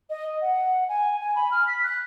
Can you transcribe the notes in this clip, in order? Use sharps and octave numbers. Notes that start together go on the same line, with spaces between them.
D#5
F#5
G#5
G#5
B5
F6
B6
F#6